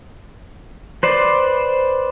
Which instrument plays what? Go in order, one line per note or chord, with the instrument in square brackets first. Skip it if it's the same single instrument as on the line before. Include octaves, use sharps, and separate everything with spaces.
[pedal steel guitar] B4 C5 D5